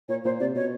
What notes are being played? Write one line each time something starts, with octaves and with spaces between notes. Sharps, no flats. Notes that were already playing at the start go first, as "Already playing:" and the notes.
A#2 C#5
A#2 C5
C3 D5
B2 C#5